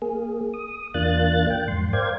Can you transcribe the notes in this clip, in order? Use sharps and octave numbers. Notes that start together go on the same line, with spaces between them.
A#3 G#4
D#6
E2 A#3 D4 F4 F#6 A6
G5
F2 G#2 C6
A#4 C5 D5 F5 G5 G#6